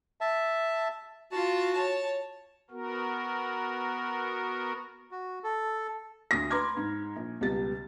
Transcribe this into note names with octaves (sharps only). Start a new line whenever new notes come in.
E5 A5
F4 F#4 A5
C#5 A5
B3 F#4 A#4
F#4
A4
D2 D#6 A#6
B4 A#5 C6 D6 F6 G#6
G#2
A#1
C#2 B2 G3 A6